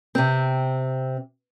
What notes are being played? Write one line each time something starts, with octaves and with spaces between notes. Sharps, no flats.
C3 C4